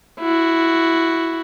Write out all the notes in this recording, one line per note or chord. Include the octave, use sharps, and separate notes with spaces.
E4 F#4